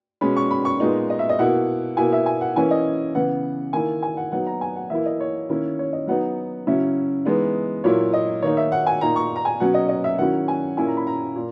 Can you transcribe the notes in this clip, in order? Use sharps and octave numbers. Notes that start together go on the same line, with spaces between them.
B2 G#3 C#4 B5
C#6
B5
C#6
A#2 G#3 B3 D#4
D#5
E5
D#5
B2 A#3 E4 F#5
B2 A#3 E4 G#5
E5
G#5
F#5
E3 A#3 C#4 E4 G#5
D#5
C#3 E3 B3 F#5
D#3 A#3 E4 G#5
G#5
F#5
F#3 B3 D#4 F#5
A#5
G#5
F#5
E3 A#3 E4 E5
D#5
C#5
D#3 A#3 C#4 E4
C#5
D#5
F#3 B3 D#4 F#5
C#3 F#3 C#4 E4 E5
E3 G#3 B3 D#4
A#2 F#3 A#3 E4 C#5
D#5
D#3 A#3 D#4 C#5
E5
F#5
G#5
A#2 A#3 D#4 A#5
C#6
A#5
G#5
B2 F#3 C#4 F#5
D#5
D#5
E5
D#3 F#3 C#4 E4 F#5
G#5
A#2 A#3 C#4 E4 G#5
A#5
B5
A#5
A#2